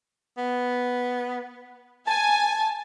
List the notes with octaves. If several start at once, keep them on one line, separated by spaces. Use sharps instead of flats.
B3
G#5 A5